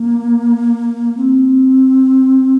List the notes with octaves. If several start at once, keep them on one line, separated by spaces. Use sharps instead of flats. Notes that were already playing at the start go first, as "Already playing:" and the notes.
Already playing: A#3
C4